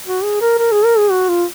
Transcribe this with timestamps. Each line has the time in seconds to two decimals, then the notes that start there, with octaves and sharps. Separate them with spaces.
0.06 F#4
0.23 G#4
0.41 A#4
0.59 A#4
0.72 G#4
0.85 A#4
0.98 G#4
1.11 F#4
1.29 F4